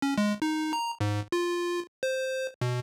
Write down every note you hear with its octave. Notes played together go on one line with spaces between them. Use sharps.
C#4
G#3
D#4
A#5
G#2
F4
C5
B2